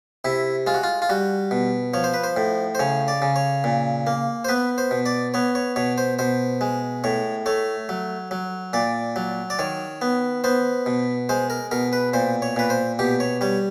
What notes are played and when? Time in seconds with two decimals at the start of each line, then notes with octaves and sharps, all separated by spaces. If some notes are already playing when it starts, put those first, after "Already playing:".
0.25 C3 E4
0.67 G#3 F4
0.74 F#4
0.83 F4
1.02 F4
1.09 G3 F#4
1.51 B2
1.94 F3 C#5
2.04 C5
2.14 B4
2.24 C5
2.36 A2
2.75 C5
2.79 C#3 C#5
3.08 D5
3.22 C#3
3.36 C#5
3.64 A#2
4.07 A#3
4.45 C5
4.48 B3 B4
4.78 C5
4.91 B2
5.06 D5
5.34 B3 C#5
5.55 C#5
5.76 B2 C#5
5.98 C5
6.19 B2 C5
6.61 G#3
7.04 A2 C#5
7.46 A3 C#5
7.89 F#3
8.31 F#3
8.73 A#2 D5
9.16 F#3
9.50 D5
9.59 D#3 C#5
10.02 B3
10.44 B3 C5
10.86 B2
11.29 G#3 C5
11.50 A#4
11.71 B2 A#4
11.93 B4
12.13 A#2 C5
12.42 C#5
12.56 A#2 B4
12.70 C5
12.99 B2 G4
13.20 C#5
13.41 G3 C#5